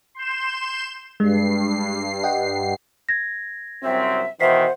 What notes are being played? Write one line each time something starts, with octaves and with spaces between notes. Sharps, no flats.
C6 G6 E7
G2 G#3 C7
D#5 F#5 G5
G#6 A#6
C2 F#2 C4 E5
B2 D#3 E3 C5 E5 F#5 B6 C7